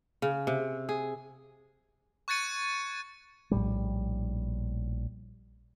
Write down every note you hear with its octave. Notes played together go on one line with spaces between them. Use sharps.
C#3
C3
G#4
C#6 F#6 G#6 A6 C#7 D#7
A#1 A2 G3